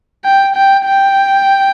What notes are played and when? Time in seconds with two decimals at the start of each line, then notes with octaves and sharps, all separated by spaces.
0.25 G5
0.56 G5
0.86 G5